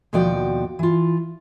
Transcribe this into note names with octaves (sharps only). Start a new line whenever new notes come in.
D#2 B2 F3 F#4 D5 G5
E3 F4